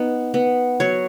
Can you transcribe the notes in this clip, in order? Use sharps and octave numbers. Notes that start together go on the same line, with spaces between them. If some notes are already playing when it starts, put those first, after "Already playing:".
Already playing: B3 D#4
B3
F#3 C#5